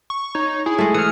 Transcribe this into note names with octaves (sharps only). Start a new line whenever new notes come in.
C#6
D#4 C#5
E4 G#4
G#3 A3
E3 D#6 F6 C#7